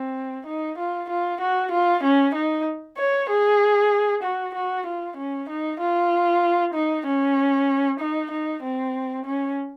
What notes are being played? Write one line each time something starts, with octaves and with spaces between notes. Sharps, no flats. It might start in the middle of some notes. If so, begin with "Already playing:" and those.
Already playing: C4
D#4
F4
F4
F#4
F4
C#4
D#4
C#5
G#4
F#4
F#4
F4
C#4
D#4
F4
D#4
C#4
D#4
D#4
C4
C#4